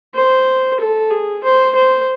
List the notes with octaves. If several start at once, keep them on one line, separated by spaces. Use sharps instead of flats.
C5
A4
G#4
C5
C5